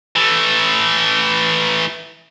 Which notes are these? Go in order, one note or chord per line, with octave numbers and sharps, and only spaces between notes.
E3 A3